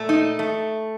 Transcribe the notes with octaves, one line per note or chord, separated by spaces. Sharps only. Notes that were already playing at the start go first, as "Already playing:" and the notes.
Already playing: A#2 A3
D#4
A3